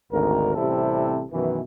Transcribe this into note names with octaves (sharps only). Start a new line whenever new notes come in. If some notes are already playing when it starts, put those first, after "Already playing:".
G#1 D2 A#4
A1 C3 G3 C4 E4 A4
F#2 B2 D#3 E3